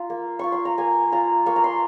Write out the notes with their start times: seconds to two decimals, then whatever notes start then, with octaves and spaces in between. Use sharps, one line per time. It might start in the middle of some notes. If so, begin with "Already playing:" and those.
Already playing: F4 A#5
0.10 A#3
0.39 F4 C#6
0.52 C6
0.65 A#5
0.78 A#3 G#5
1.12 F4 A#5
1.46 A#3 C#6
1.56 A#5
1.64 C6